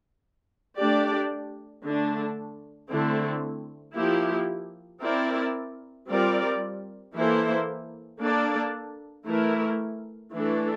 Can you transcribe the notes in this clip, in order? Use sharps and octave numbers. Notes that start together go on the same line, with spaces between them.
A3 D4 G4 D5
D3 A3 D4
D3 A3 C4 E4
F3 A#3 E4 G4
C4 E4 A#4 D5
G3 C4 F4 A#4 D5
E3 A#3 E4 A4 C5
A#3 D4 A4 D5
E3 A3 E4 A#4
E3 A3 D4 A4